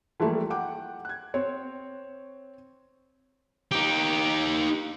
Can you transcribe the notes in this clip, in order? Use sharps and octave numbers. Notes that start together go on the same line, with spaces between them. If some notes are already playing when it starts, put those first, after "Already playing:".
E3 F3 G3 A3 A#3
F#5 G5 D6
F#6 G#6
C4 C#5
D#4 G4